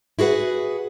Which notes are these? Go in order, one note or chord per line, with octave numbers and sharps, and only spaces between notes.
E4 F#4 G#4 B4 F#5